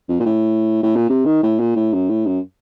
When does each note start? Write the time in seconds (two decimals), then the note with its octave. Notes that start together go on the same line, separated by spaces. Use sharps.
0.08 F2
0.20 A#2
0.25 A2
0.83 A2
0.96 A#2
1.09 C3
1.25 D#3
1.43 A2
1.60 A#2
1.75 A2
1.93 F#2
2.09 A2
2.26 F#2